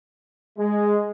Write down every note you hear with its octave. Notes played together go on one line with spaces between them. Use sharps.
G#3